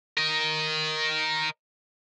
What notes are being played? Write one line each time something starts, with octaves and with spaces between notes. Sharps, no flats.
A#4 D#5